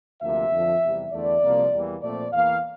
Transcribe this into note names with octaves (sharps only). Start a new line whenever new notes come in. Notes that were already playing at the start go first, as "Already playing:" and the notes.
D2 C3 F3 A#3 E5
F2 D3 F3
E2 C3 G3
E2 D3 A3 D5
C2 C3 F3 A#3
E2 E3 G3 A#3
A#2 F3 A3 C4 D5
E2 E3 A#3 F5